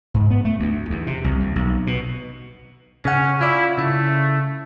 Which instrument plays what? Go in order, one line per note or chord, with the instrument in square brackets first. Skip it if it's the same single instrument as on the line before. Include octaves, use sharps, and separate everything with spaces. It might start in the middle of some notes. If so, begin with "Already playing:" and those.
[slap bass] G#2
B3
A3
D2
E2
C3
C2
D#2
B1
B2
[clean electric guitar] C#3 F#5 [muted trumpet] C#4
[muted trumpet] E4 [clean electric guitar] F4 D5
[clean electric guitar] C#3 E4 [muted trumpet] A3